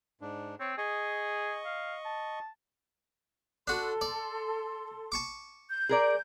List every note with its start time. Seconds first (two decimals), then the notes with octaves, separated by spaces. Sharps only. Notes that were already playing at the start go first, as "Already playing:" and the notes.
0.21 G#2 D4
0.60 C4 C#5
0.78 G#4 D#5 C#6
1.65 F5
2.05 A5
3.67 D4 F#4 A4 C6
4.01 D5
5.12 A5 C#6 D6
5.70 G6
5.89 G#4 A#4 D5